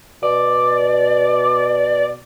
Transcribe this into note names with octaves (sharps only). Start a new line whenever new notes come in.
B2 D5